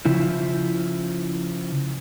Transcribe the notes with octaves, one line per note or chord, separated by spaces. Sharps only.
C#3 F3 E4